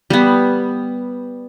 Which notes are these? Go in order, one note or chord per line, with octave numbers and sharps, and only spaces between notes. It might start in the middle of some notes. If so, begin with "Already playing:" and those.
G3 B3